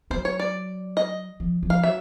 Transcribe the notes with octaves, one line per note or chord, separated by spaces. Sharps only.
F#3 C5
C#5
D5
D#5
F3
F3
F5
F#3 E5